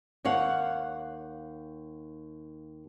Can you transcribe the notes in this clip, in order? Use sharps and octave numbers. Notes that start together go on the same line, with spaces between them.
D#2 C#5 F5 F#5